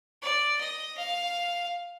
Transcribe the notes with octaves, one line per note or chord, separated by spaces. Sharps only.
D5
D#5
F5